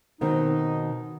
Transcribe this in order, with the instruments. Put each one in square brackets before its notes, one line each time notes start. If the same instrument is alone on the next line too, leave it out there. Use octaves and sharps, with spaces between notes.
[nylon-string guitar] B2 D#3 C4 [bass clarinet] D#4